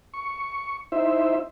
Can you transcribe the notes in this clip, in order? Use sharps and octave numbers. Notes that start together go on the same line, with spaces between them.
C#6
D#4 E4 C5 E5